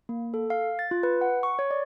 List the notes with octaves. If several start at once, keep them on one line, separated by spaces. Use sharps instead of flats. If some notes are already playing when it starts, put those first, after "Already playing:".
A#3
A4
F5
A6
F4
B4
F#5
C#6
C#5
D5